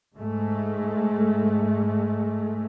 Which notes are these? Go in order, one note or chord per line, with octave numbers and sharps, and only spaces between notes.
G#2 G#3 A3